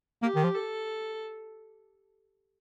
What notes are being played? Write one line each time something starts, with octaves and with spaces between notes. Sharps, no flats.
A#3 G4
D#3
F3
A4